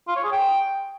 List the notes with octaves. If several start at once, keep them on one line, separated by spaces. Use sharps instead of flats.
F4
C#5
G#4
G5